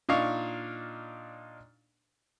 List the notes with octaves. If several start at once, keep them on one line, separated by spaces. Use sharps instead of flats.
A#2 D4 D#4 F5 C#6